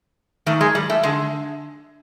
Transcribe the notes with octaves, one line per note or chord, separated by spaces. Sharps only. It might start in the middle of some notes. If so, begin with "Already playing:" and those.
G#2 D#3 A3
G#3
G3
A3
D3 G#3